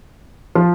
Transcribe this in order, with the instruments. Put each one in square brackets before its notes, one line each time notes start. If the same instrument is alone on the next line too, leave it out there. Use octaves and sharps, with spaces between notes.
[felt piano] F3 F4